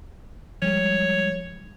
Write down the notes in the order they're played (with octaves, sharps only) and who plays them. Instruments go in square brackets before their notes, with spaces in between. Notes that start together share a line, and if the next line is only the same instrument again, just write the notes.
[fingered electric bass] F3 G3 G#3 [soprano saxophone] C#5